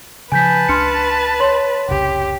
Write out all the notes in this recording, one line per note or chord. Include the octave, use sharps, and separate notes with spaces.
C#3 F3 B4 G#5 A5 G6 B6
C#2 D4 C6 F6 C#7
C#5 C6 F#7
F1 C2 C#3 G4